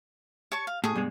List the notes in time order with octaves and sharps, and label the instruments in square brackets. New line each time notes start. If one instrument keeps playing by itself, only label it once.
[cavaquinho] C#5 A5 C#6
F5
[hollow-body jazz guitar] A2 [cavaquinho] G#4 C#6 D#6
[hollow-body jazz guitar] G2 B2 G#3